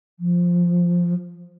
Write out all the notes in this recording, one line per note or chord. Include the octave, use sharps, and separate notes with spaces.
F3